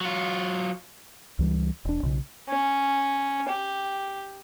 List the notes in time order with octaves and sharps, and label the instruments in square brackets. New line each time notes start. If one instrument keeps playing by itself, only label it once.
[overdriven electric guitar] F#3 F4
[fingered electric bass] C#2 E3 G3
E1 D4
B1 C#3
[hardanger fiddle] C#4
G4